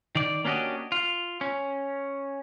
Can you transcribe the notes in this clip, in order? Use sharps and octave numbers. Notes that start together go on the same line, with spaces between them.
D#3 D5
A#3 C#4 D4 F#4 G4 D#5
F4
C#4